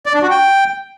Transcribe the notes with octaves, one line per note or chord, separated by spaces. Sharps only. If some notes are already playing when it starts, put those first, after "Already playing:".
D5
D4
F#4
G5